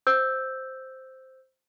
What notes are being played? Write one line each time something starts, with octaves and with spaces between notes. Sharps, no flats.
C5 E6 G6